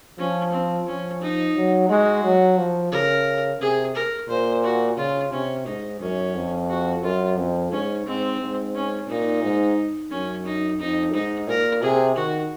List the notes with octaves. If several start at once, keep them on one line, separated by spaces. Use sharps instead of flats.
F3 C#4
C4
F3 C#4
D#4
F#3
G#3 F#4
F#3
F3
C#3 A#4
C3 G#4
A#4
A#2 C5
F#4
C#3 F4
C3 C#4
G#2 D#4
F#2 C#4
F2
F#4
F#2 F4
F2
G#2 C#4
G#2 C4
G#2
C#4
A#2 D#4
G#2
F#2 C#4
D#4
F2 D#4
G#2 D#4
A#2 A#4
C3 G#4
D#3 F#4